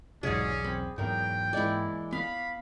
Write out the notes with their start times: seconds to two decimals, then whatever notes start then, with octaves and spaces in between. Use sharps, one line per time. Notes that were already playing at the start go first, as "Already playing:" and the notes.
0.23 E1 B1 G#2 C3 F#3 C#4 G#4 D5
0.64 C4 B5
0.98 E2 G#2 F#3 B3 A#4 G5
1.53 E3 G#3 A#3 E4 D5
2.13 B3 F5 B5